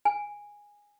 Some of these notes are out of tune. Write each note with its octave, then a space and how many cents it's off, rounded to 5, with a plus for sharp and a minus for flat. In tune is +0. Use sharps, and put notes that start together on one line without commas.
G#5 -10